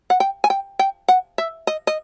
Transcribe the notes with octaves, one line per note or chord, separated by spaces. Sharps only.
F#5
G5
G#5
G5
G5
F#5
E5
D#5
D#5